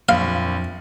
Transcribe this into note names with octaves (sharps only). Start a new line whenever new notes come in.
A#1 F2 F#3 F5